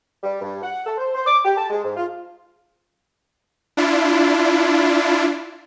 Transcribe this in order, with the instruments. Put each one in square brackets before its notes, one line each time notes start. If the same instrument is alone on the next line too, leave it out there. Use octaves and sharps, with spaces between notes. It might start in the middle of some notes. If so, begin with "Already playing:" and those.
[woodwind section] G3
G2
F#5
A4
C5
C5
D6
G4
A5
G#3
G#2
F4
[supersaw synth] D4 E4 F4